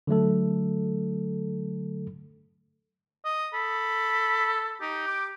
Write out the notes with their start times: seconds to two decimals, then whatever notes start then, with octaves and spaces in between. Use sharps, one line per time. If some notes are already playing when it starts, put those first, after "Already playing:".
0.07 D3 F#3 A3 A4
3.25 D#5
3.54 A4 B5
4.82 D#4 G4
5.08 D6